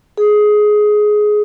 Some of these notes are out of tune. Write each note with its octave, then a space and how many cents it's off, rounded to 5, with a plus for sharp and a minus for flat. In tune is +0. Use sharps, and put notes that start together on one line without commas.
G#4 +15